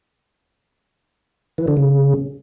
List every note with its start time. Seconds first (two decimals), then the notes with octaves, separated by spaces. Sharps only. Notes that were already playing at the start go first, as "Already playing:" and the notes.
1.58 E3
1.68 D3
1.77 C#3